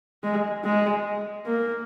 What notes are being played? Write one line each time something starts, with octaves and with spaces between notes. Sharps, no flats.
G#3
G#3
A#3